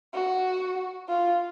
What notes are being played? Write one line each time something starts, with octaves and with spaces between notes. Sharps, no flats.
F#4
F4